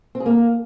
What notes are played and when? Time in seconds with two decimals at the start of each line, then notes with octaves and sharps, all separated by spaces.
0.15 C4
0.20 G#4
0.26 A#3